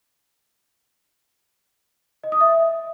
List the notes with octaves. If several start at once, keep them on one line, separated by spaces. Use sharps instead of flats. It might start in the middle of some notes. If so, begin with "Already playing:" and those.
D#5
D#6
E5